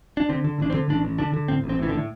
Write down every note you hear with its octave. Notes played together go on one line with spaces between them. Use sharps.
D4
D3 C4
D3
A1 D4
C4
D3
A1 D4
A1
D3 D4
D3
A2 C4
A1
C4
A2 E3
D3
A2